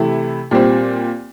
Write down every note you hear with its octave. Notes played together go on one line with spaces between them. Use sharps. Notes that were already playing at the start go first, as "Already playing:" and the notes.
Already playing: C3 E3 A3 E4
A#2 G3 C4